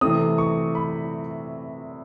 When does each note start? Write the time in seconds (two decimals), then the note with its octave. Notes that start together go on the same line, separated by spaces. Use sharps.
0.01 C3 E3 A3 C4 D#6
0.38 C#6
0.75 B5